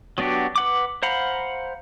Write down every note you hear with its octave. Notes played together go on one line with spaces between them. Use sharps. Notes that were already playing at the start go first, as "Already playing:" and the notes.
F#3 B3 D4 F#4 G4
B4 F#5 D6
C5 F5 F#5 A#5 B5